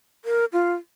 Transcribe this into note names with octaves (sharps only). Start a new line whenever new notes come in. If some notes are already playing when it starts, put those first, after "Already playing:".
A#4
F4